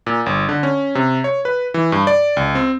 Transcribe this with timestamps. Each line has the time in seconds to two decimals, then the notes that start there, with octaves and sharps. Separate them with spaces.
0.07 A#2
0.26 G1
0.49 D3
0.63 C#4
0.95 C3
1.24 C#5
1.45 B4
1.74 E3
1.92 G2
2.07 D5
2.37 C#2
2.55 C4